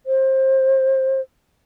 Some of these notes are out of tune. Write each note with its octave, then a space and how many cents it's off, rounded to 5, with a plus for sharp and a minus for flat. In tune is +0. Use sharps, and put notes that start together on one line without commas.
C5 +25